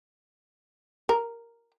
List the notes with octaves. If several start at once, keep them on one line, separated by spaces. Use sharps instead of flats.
A#4